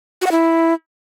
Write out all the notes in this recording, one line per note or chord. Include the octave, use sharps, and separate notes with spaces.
F#4
F#5
E4